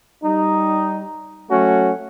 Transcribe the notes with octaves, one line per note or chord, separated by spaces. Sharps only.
G3 D#4
F#3 A3 C#4 F#4